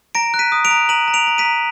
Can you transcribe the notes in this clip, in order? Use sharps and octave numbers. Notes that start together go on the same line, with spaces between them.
A#5 A#6 D7
F#6
B6 D#7
D#6
D7 F7
A#5
A#5 D#7 F#7
A#5
D7 F7
A#5
B6 D#7
A#5